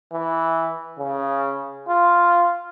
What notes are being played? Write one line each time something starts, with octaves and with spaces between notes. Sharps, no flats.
E3
C#3
F4